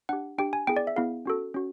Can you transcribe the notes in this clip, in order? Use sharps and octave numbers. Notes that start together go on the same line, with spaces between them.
D4 G4 F#5
D4 G4 G5
G#5
B3 E4 G#4 G5
D5
E5
B3 E4 G#4 F5
C#4 F#4 A4
C#4 F#4